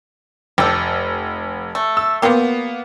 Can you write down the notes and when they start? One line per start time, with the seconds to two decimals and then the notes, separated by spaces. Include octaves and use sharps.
0.58 F1 G4 A4
1.75 A3
1.97 E6
2.22 F#3 A#3 B3 F4 G4